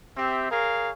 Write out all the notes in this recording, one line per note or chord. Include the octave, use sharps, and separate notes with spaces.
C4 G4 E5
G#4 A#4 C#5 F5